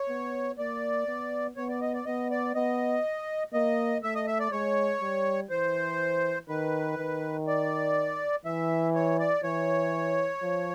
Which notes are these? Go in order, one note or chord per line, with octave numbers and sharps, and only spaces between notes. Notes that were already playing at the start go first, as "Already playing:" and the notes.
Already playing: C#5
B3
A#3 D5
B3
B3 C#5
D5
D#5
D5
B3 D#5
D5
B3 D#5
A#3 D#5
A3 E5
D#5
E5
D5
G#3 C#5
G3
E3 C5
D#3 B4
D#3
D5
E3 E5
C#5
D5
E3 C#5
F3